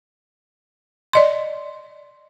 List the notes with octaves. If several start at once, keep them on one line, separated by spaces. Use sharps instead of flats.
D5 D#5 C6